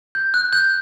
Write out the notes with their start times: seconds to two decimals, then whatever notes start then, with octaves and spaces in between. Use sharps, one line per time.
0.15 G6
0.34 F#6
0.53 G6